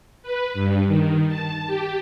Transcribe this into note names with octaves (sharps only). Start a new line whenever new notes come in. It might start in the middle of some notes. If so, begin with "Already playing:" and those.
B4
G2
D#3
A5
G4